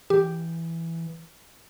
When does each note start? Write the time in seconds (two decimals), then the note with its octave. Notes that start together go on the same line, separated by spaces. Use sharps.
0.10 E3 G4